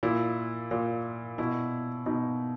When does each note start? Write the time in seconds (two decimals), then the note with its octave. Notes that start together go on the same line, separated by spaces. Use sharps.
0.03 A#2 E4
0.71 A#2
1.38 B2 E4
2.06 B2 D#4